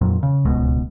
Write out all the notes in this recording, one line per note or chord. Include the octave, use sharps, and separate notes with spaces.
F2 A#2 F#3
C#3
D1 C#2 B2 G#3